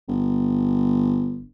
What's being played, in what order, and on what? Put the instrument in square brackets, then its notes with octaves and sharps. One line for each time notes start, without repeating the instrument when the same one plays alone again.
[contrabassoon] G1